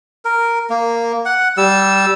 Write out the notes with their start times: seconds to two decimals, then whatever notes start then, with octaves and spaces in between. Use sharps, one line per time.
0.25 A#4
0.70 A#3
1.25 F#5
1.57 G3 E6